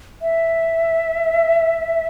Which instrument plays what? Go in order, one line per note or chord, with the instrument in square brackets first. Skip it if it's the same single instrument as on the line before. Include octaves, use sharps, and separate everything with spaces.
[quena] E5